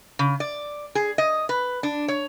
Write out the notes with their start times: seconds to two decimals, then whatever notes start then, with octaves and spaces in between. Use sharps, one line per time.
0.19 C#3
0.40 D5
0.95 G#4
1.18 D#5
1.49 B4
1.83 D4
2.08 C#5